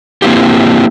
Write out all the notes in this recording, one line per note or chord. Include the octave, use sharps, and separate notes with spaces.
A#3 C4 E4 F4 G4